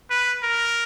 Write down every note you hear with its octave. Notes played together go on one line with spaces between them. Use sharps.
B4
A#4